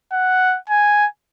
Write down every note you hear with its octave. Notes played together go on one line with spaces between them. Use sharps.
F#5
G#5